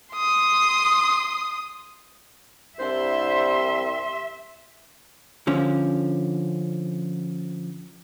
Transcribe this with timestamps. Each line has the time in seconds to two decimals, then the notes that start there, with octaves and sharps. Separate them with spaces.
0.15 C6 D#6
2.79 C2 D4 E4 C5 E5 C6
5.47 D3 F3 C#4